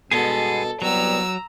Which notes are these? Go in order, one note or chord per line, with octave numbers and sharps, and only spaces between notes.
G2 B2 G#3 B3 G#4 A4
C2 F#3 G3 B3 A#5 E6